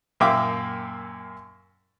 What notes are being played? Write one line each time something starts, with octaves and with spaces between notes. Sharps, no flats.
F#2 A#2 A#3 E5 G5 D6